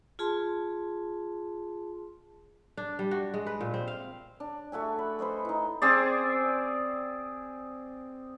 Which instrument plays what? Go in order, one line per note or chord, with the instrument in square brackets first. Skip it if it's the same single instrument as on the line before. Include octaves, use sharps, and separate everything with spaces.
[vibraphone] F4 G#4 A5 C6
[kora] D4
G3
F#4
G#3
B4
A#2
C4
F5
[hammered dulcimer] D4
A3 F#4 E5 G#5
B5
B4 C5 D#5 C#6
D#4 E4
C4 G#4 D5